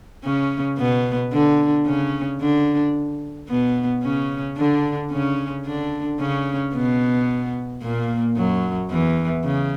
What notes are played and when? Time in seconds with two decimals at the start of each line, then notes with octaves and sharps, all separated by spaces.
0.24 C#3 C#4
0.78 B2 B3
1.33 D3 D4
1.86 C#3 C#4
2.41 D3 D4
3.49 B2 B3
4.04 C#3 C#4
4.57 D3 D4
5.11 C#3 C#4
5.66 D3 D4
6.20 C#3 C#4
6.74 B2 B3
7.82 A#2 A#3
8.37 F#2 F#3
8.91 E2 E3
9.45 C#3